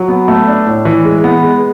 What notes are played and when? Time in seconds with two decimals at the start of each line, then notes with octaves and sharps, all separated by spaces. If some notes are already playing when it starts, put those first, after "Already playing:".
Already playing: F#3
0.08 B3
0.28 A3
0.48 D4
0.67 A2
0.85 E3
1.05 G#3
1.24 B3
1.43 G#3